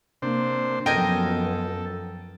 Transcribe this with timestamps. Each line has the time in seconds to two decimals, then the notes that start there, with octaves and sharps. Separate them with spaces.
0.22 C3 A#3 D4 C5
0.86 F#2 F3 B3 A4 A#4 D#5 G5 G#5